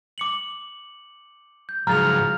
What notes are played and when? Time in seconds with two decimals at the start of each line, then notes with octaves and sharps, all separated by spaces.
0.18 D6 C#7 F#7
1.69 G6
1.87 G#2 C#3 F3 F#3 A#5 F6 A6 F7